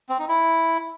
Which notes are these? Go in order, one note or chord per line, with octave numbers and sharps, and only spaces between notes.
C4
D#4
E4